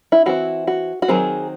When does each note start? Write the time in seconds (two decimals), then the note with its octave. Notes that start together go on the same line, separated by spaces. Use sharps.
0.12 E4
0.26 E3 C4 E4 F#4
0.67 F#4
1.02 F#4
1.08 D#3 F#3 C4 G#4